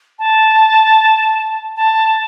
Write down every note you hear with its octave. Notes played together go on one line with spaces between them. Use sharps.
A5
A5